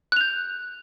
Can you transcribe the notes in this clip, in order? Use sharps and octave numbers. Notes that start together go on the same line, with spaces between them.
F#6 G6 F7